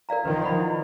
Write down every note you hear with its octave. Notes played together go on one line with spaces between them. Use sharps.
A#4 D5 F5 A#5
D#3 F3 B4
D5 F#5 B5
E4